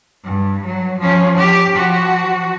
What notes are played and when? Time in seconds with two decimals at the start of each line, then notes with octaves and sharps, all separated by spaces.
0.25 G2
0.65 F#3
0.99 F3 C#4
1.37 G4
1.74 F3 F#4